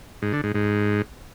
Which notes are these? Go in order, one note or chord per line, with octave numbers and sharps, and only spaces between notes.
G#2
D3
G#2
G#2